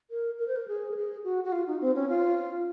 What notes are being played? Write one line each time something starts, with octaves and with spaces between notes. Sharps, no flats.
A#4
A#4
C5
A#4
G#4
A#4
G#4
F#4
F#4
F4
D#4
C4
C#4
F4